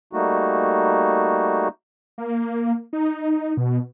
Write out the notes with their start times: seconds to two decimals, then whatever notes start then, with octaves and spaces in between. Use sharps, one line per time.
0.13 G3 A3 A#3 D#4 F#4
2.18 A#3
2.93 D#4
3.57 B2